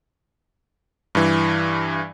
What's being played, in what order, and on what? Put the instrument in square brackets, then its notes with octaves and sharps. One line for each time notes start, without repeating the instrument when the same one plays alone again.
[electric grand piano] G2 E3